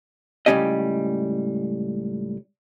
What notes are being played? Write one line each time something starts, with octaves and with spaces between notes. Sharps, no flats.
C#2 A2 G3 C#4 G4 D#5